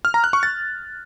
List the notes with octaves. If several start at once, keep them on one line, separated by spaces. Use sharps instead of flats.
F6
A#5
F#6
C#6
A6